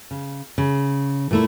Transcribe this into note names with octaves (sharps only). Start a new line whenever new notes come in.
C#3
C#3
A#2 A3 E4